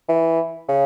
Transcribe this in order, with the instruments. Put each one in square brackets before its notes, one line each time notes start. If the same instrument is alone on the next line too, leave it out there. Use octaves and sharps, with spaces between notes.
[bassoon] E3
C#3